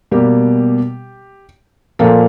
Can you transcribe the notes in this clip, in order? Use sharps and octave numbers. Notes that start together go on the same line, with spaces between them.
B2 G3 A#3 G4
A#2 F3 A#3 A4